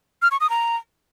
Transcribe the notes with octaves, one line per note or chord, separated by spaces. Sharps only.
F6
C#6
D#6
A#5